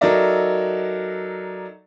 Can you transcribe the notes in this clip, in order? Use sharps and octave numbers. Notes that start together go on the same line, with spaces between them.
F#3 D#4 A4 A#4 D5 E5